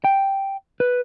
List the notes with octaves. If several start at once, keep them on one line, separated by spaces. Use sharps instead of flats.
G5
B4